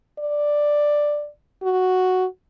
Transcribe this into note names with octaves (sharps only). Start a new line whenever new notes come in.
D5
F#4